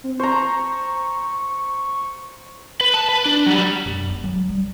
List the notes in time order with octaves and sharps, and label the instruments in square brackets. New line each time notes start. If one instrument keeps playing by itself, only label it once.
[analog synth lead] C4
[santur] C5 A#5 [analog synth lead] C#6
[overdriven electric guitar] B4
A5
B4
D4
F#3 G3
[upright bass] F#2
B3
F#3
G3